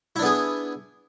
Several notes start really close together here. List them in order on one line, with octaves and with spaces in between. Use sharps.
E4 D4 B3 G#4